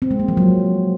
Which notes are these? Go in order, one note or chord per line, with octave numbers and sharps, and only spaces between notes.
C4
G#3
A#3
F3
F#3